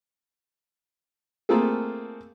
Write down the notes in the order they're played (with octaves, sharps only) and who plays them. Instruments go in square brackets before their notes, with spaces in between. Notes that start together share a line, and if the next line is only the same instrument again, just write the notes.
[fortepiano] A3 A#3 C4 F4 G#4 A4